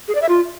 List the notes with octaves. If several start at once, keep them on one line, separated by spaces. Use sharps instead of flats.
G#4
D5
E5
F4